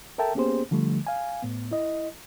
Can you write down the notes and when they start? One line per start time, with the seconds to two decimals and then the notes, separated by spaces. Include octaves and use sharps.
0.18 A4 A#4 E5 G5 A5
0.35 A#3 B3 C#4 G4 G#4 C5
0.71 D3 F3 G3 A3
1.07 F5 G#5
1.43 A2 B3
1.71 E4 D#5